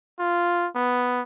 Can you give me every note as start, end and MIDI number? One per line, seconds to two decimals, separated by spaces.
0.19 0.67 65
0.75 1.21 59